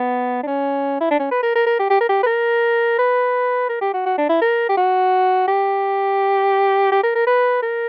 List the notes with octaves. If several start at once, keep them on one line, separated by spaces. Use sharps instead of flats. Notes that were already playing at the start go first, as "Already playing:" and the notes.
Already playing: B3
D4
C#4
E4
D4
C#4
B4
A#4
A#4
A#4
G4
G4
A#4
G4
B4
A#4
B4
A#4
G4
F#4
F#4
D4
E4
A#4
G4
F#4
G4
G4
A#4
A#4
B4
A#4